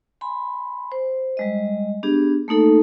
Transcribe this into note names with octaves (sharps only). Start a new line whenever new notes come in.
G#5 B5 C6
C5
G3 G#3 D#5
B3 D4 G4 G#4
A3 A#3 D#4 A4